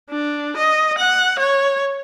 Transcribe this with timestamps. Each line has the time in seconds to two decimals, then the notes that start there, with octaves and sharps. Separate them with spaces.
0.10 D4
0.57 D#5
0.98 F#5
1.39 C#5